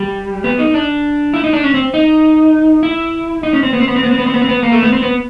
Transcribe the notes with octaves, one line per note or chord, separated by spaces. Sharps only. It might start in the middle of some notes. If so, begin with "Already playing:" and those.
Already playing: G3
B3
D#4
D4
E4
D#4
D4
C#4
C4
D#4
E4
D#4
C#4
C4
B3
C4
B3
C4
B3
C4
B3
C4
B3
C4
B3
A#3
A3
B3
C4
B3